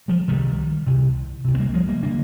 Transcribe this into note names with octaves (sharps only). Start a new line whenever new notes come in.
F3 G#3
C2 C3 D#3 G3
C2 C3
C2 C3
C4
G3 A#3
F3 G#3
G3 A#3
D3 A#3 D4